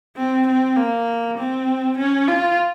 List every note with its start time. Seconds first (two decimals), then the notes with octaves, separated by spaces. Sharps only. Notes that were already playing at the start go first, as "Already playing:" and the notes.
0.16 C4
0.47 C4
0.77 A#3
1.38 C4
1.98 C#4
2.28 F4